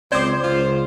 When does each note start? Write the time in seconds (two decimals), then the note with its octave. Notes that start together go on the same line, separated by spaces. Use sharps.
0.12 C#2 C4 C5 D5 D6
0.44 C#2 F4